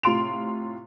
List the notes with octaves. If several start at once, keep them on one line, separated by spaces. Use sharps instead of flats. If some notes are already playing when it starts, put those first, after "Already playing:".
A2 C3 F4 C6 D7 F7